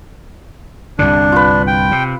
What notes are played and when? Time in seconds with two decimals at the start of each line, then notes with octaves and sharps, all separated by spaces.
0.99 C2 G2 D3 D4
1.32 F4 B4
1.67 G5
1.91 C3